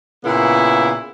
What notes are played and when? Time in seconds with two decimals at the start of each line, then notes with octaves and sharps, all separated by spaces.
0.24 A#2 C#3 B3 E4